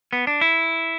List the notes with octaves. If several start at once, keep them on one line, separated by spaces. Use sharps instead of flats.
B3
D4
E4